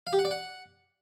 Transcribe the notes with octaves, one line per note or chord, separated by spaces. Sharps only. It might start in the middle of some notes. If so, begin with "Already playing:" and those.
F5
G4
F#5
D5
F#5